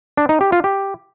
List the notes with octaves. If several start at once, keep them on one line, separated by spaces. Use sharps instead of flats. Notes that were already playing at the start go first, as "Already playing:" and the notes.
D4
D#4
G4
F4
G4